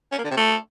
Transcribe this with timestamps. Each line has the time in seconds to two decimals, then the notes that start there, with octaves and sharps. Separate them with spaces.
0.12 C#4
0.18 A#3
0.24 D3
0.30 C3
0.37 A3